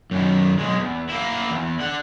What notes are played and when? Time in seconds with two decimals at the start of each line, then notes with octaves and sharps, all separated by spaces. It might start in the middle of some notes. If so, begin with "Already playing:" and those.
0.11 F#2 D#3
0.57 B1 G#3
0.80 E2
1.09 A#3 E4
1.51 E2
1.79 D3 F#5